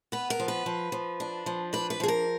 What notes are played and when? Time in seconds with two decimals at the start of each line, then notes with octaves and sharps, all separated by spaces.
0.12 B3 B4
0.30 A#4
0.40 F3
0.48 B4
0.66 F3
0.92 F3
1.20 D4
1.46 F3
1.73 D4 B4
1.90 B4
2.00 F3 G#4
2.08 A#4